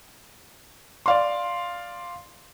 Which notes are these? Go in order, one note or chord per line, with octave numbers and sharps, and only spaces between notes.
D5 F5 C6